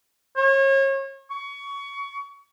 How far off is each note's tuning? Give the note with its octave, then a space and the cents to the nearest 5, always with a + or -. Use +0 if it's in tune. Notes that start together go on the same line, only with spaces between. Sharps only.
C#5 -35
C#6 +25